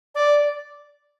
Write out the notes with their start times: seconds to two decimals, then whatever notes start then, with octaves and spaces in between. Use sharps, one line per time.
0.15 D5